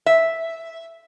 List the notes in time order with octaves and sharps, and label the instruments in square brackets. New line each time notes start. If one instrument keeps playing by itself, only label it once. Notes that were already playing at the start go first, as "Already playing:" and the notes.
[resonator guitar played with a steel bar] E5